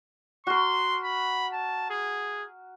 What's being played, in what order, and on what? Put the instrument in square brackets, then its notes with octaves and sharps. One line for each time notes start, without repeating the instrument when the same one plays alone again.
[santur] F#4 A#4 [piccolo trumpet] C6
[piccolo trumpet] B5
A5
G#4